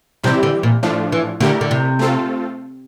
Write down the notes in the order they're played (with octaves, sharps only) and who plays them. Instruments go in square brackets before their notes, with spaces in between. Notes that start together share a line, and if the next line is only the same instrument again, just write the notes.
[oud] C3 [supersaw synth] E3 G3 C4 E4 G4
[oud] D3
A#2
[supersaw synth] A2 F3 A3 D4 F4
[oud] E3
[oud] D3 [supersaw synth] A3 E4 G4 A#4
[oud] D3
C3
[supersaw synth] A3 C4 F4 A4